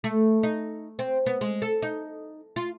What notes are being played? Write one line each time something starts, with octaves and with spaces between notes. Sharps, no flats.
A3
D#4
C4
B3
G#3
A4
D#4
F4